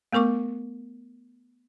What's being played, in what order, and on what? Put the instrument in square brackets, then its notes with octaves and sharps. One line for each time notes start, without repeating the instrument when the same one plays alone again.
[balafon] A3 B3 A#4 C#6 D6